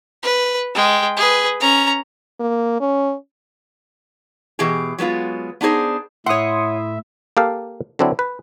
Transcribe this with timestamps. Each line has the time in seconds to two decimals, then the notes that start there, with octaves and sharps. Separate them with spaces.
0.23 B4
0.74 G#3 G5
1.17 G#4 B4
1.60 C#4 A#5
2.41 A#3
2.81 C#4
4.59 B2 E3 G4 G#4
4.98 F#3 G#3 B3 F4
5.61 B3 D4 D#4 G#4 C5
6.26 A2 E4 C#5 E5 F#5 C6 D#6
7.37 A#3 G4 A4 F5
7.99 D3 F#3 C4 D4 E4
8.19 B4